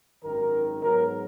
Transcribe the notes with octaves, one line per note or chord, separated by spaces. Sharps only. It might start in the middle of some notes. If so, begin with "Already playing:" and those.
G#1 F#2 D#3 A#4
G#2 F#3 B3 A#4